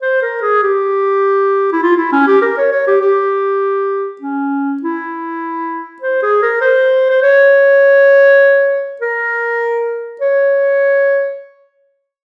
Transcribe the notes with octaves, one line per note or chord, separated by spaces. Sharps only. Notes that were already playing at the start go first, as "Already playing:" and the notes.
C5
A#4
G#4
G4
E4
F4
E4
C#4
G4
A#4
C#5
C#5
G4
G4
C#4
E4
C5
G#4
A#4
C5
C5
C#5
A#4
C#5